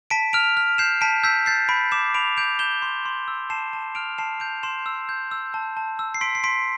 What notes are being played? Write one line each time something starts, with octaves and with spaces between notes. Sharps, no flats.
A5 B6 D7
F6 D7 F7
F6
G6 C7 E7
A5 B6 D7
E6 G6 B6
G6 A6 C7
B5 B6 D7
D6 C7 E7
B5 D7 F7
G6 D7 F7
G6 E7 G7
C6
C6
E6
A5 C7 E7
A5
F6 D7 F7
A5 C7 E7
G6 D7 F7
C6 C7 E7
E6
G6
E6
A5
A5
E6
C7
C6 B6 D7
C7
C6 B6 D7